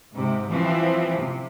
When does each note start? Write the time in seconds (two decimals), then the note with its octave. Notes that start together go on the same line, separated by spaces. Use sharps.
0.13 G#2 C3
0.49 E3 F3 G3 C4 E4
1.17 C3